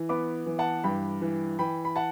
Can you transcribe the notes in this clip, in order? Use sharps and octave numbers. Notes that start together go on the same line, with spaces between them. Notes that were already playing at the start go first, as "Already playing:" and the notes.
Already playing: E3
B3 B5 D6
E3
F#5 A5
G2 G5 B5
E3
E3 G5 B5
B5
F#5 A5